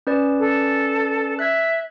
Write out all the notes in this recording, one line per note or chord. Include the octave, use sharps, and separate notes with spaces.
C#4 B4 D5
A4
E5 F#6 G#6